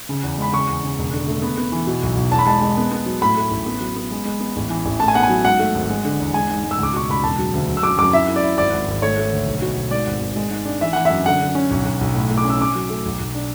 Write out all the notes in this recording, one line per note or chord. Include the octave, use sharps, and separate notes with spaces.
C#3
E2
G#3 B5
C#3 C#6
E2
C#3
E1
D3
A3
B3
B3
E3
B2
B1
B1
E2 A5
B5
G#3 A5
G#3
B3
B3
F#3
A2 B5
A3
A1
B3
F#3
B3
G#3
G#3
B3
A1
E3
A1
A2 A5
G#5
B3 F#5
G#5
F#3
G#2 F#5
A3
G#1
G#3
D3
E2
G#3 G#5
G#2
G#3
E6
C#2 D6
B2 C#6
C#2 B5
E1 A5
F#3
D2
F#3
E6
F#2 D6
F#2 D6
E4 E5
E4
D5
E4
G#1 D5
G#1
G#1
A3 C#5
A3
D2
B1
B2
B2
G#2 D5
G#1
G#1
G#3
G#2
D4
E3 E5
E3 F#5
F#2 E5
D3 F#5
D3
C#4
B1
B1
B1
A2
A2
D6
C#4
E6
C#4 D6
F#3
A3
B1
B1
D4